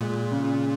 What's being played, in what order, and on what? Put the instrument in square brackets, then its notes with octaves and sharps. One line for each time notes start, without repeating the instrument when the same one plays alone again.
[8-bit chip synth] A#2 [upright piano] G#3
[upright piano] C#3